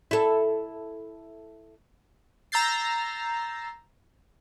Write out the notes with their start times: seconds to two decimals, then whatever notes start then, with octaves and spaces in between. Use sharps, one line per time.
0.11 E4 A4
2.52 A#5 E6 G6 A6 C7